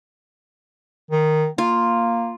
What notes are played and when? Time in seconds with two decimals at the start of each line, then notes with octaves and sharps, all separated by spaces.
1.11 D#3
1.58 A#3 F4